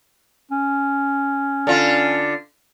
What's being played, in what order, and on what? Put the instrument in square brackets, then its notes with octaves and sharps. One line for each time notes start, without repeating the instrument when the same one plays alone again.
[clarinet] C#4
[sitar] D3 F4